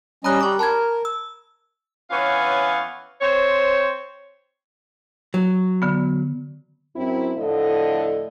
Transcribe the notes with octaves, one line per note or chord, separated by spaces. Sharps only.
G3 C#4 D#5 A#5 B5 F#6
G3 C#6 D6
A#4 A5 B5 G#6
E6
E3 B3 C#4 C#5 F5
C4 C5 C#5
F#3
D3 B3
F#2 C4 E4
A2 D3 F3 A3 A4 D#5